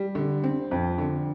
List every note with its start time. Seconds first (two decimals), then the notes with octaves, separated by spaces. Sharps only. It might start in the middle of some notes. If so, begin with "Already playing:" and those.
Already playing: G3
0.15 D3
0.44 C4
0.71 F2
0.98 D3